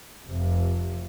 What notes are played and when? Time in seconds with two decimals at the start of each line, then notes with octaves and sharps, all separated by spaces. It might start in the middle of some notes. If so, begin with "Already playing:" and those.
0.24 F1 F2 C3